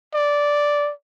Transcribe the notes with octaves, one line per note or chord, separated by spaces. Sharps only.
D5